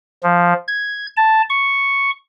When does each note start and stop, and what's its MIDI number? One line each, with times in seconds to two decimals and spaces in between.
0.23 0.53 53
0.68 1.07 92
1.17 1.42 81
1.50 2.10 85